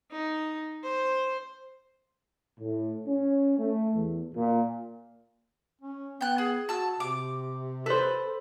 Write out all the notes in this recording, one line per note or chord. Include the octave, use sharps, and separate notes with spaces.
D#4
C5
A2
C#4
A3
E2
A#2
C#4
B3 G5 F#6
G#4
F#4 A5 E6
C3 D6
A4 B4 C5